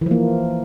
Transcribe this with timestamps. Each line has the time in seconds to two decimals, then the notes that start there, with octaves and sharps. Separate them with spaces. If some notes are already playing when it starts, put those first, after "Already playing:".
0.01 E3
0.06 F3
0.11 A#3